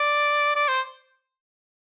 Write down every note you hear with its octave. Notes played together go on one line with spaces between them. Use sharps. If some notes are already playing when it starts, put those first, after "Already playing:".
Already playing: D5
D5
C5